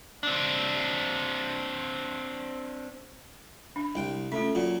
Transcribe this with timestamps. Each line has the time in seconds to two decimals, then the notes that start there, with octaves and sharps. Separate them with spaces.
0.23 C4 D4
3.76 D4
3.95 C2 G5
4.32 A3 C#4 F4
4.55 A#2 F#3